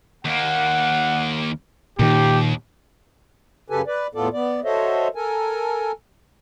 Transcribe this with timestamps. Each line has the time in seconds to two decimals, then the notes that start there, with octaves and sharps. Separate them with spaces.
0.25 D#2 A#3 F#5
1.99 D#2 A#2 D#3 G4
3.70 F#2 C#3 G4 A4 B4 G#5
3.87 B4 D5
4.15 E2 A2 B3 F4 A4 D5
4.33 B3 D5
4.64 F#4 A4 C5 C#5 D#5 E5
5.15 A4 A#4 G#5